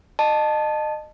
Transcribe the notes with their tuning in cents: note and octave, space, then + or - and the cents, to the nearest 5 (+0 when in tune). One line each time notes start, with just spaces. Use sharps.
D#5 -30 A5 +0